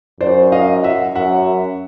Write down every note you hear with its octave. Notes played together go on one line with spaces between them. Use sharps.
F#2 C5 D5
D#5 F5
E5 F#5
F#2 E5 F#5